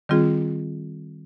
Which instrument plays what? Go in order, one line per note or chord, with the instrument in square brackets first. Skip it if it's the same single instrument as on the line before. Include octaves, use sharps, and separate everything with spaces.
[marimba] D#3 G3 C4 F4 G#4